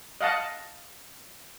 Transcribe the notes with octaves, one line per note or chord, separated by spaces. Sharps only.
D#5 F5 F#5 A5